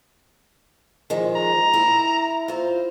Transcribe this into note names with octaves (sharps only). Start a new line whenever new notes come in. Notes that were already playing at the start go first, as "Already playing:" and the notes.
D#3 F3 G#3
A#5
E4
F4 C5